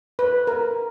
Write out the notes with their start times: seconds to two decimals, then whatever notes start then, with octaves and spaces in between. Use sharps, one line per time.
0.19 B4
0.47 A#4